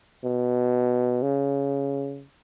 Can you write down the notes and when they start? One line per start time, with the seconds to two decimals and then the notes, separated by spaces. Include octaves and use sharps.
0.24 B2
1.22 C#3